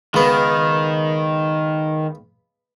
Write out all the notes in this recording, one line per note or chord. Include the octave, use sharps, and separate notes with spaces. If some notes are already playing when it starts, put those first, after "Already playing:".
C#2 D#3 B3